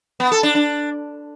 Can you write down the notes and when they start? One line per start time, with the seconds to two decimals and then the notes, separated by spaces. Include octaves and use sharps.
0.20 B3
0.32 A4
0.43 D4
0.55 D4